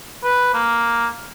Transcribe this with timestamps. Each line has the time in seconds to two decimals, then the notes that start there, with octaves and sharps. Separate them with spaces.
0.24 B4
0.54 A#3